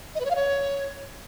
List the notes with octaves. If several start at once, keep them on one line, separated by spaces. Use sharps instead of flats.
D#5
B4
C#5
F5
C#5